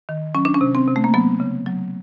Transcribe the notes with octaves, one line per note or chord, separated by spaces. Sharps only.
D#3
F#3 C#4
D4
C#4
C3
C4
C3
A3
A#3
F#3 B3
C#3
F#3